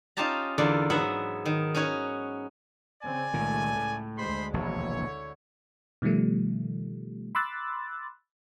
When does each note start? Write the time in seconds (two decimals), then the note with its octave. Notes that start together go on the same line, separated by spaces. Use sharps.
0.17 C#4 D#4 F4 G4 A5 A#5
0.58 E2 D3 A#3 F4 D5
0.90 G#2 F#3 B3 E5 F#5
1.45 D#3
1.75 C#4 D#4 F#4 C#5
3.03 C#3 C4 D5 G#5
3.34 C#2 A#2 D#3 A3
3.75 A2
4.17 D2 G#3 C5 B5 C6
4.54 E1 A#1 D#2 E4 C#5
4.98 D3
6.02 B2 D#3 F3 G3 A3
7.35 B5 C6 D6 E6 F#6 A6